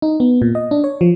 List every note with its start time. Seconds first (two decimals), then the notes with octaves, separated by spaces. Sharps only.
0.02 D#4
0.20 B3
0.42 A#2
0.55 D#5
0.71 D4
0.84 C#5
1.01 F3